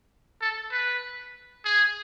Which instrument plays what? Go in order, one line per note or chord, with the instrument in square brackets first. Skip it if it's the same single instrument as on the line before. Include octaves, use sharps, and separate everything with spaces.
[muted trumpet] A4
B4
G#4